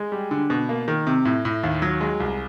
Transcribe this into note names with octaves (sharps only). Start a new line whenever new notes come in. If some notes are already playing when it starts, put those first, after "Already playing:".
Already playing: G#3
G3
D3
B2
A#3
D#3
C3
A2
A2
D#2
F#3
G#3
C2